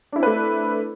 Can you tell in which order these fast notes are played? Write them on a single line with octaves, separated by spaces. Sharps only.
D4 E4 C4 B4 A3